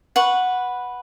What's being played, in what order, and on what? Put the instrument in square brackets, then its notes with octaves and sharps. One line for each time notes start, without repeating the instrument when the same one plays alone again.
[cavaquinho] B4 F#5 C#6